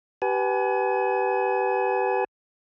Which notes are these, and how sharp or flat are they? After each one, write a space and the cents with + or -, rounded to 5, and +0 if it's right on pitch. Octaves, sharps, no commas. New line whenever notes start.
G4 -20 B4 +0 G#5 +35